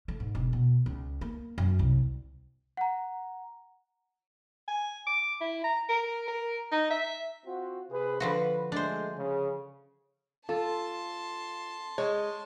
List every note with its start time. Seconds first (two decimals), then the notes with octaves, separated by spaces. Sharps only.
0.08 A3
0.20 G#2
0.35 E1
0.53 B2
0.86 C#2
1.21 A#3
1.58 F#2
1.79 C2
2.77 F#5 A#5
4.68 G#5
5.07 D6
5.41 E4
5.64 A#5
5.89 A#4
6.28 A#4
6.72 D#4
6.90 E5
7.44 C4 F4 F#4
7.90 C3 G#4 B4
8.20 D3 F3 F#4 B4
8.72 G#3 A3 D4 C5
9.17 C#3
10.49 F4 A4 A5 C6
11.98 G#3 C#5